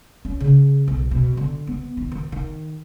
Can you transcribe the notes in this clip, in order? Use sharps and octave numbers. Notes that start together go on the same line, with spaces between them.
C#4
C#3
B1
B2
D3
B3
D#3
D#3
D#3